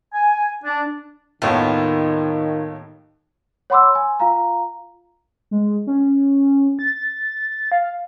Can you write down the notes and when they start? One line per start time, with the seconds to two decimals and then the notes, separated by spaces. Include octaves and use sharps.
0.14 G#5
0.63 D4
1.42 D#2 A2 D#3 B3 F4
3.70 C#5 F#5 B5 C6 D6 E6
3.95 G#5
4.20 F4 F5 A#5
5.51 G#3
5.87 C#4
6.79 A6
7.72 F5